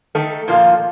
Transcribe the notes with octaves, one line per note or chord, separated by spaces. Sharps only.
D#3 A3 D#4 A4
A#2 F3 A#3 F4 A4